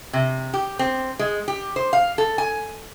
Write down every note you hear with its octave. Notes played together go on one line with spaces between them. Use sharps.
C3
G4
C4
G#3
G4
C5
F5
A4
G#5